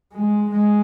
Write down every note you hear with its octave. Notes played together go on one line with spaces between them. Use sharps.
G#3
G#3